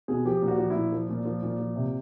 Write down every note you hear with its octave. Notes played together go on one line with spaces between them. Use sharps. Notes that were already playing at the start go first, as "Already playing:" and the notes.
B2 G#4
F3 G4
A#2
F#4
F3
E4
A#2
F3
A#2
F3
A#2
F3
C3